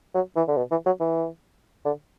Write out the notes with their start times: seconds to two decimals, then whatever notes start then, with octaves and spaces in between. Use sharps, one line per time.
0.14 F#3
0.36 E3
0.48 D3
0.57 B2
0.71 E3
0.86 F#3
1.00 E3
1.85 D3